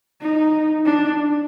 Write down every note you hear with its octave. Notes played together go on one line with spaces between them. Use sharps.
D#4
D4